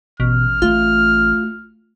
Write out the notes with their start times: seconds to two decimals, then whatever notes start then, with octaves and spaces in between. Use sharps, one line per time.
0.20 A1 B2 F6
0.62 A3 F4